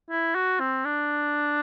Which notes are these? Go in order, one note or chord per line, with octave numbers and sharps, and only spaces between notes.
E4
F#4
C4
D4